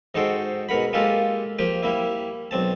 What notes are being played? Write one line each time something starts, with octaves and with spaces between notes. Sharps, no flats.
G#2 D#4 F#4 A4 C5 G5
G#2 B2 A#4 F#5 B5
G#3 A#3 F4 G4 A4 A#4
F3 A#3 G4 G5
G3 A#3 E4
B1 C4 A5